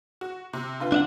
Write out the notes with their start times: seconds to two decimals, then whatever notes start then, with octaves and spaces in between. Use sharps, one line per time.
0.21 F#4
0.53 C3
0.80 D3 F4 B4
0.92 D4 E5 F#5